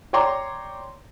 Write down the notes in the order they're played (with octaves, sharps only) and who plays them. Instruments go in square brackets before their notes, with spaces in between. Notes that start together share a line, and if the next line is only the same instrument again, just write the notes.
[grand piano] C#5 D5 G5 A#5 C6 D6